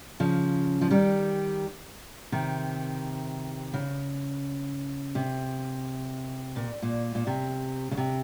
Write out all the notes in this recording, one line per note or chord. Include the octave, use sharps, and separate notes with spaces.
C#3 F3
F3
D#3 G3
C3 D#3
C#3
C3
A#2
A#2
A#2
C3
C#3
C3